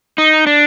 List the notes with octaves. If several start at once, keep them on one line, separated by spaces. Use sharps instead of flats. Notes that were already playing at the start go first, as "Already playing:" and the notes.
D#4
D4